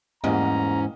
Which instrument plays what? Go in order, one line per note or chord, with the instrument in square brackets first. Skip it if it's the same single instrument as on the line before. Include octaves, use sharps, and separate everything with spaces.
[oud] E2 G#2 [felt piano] G3 A#3 D#5 [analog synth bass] C#4 [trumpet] A#5